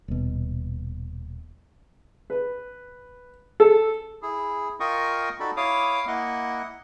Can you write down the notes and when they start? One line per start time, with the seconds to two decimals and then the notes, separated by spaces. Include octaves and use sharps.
0.08 D#1 B2
2.30 B4
3.60 A4
4.22 E4 G#4
4.80 F4 A#4 D#5 G5 C#6 D#6
5.40 D#4 F#4 A4 D5 B5
5.57 E4 C#5 F5 D6 D#6
6.07 A#3 E4 D#5 F#5